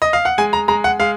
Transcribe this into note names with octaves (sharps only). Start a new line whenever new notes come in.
D#5
F5
F#5
G#3 G#5
A#5
G#3 A#5
F#5
G#3 F5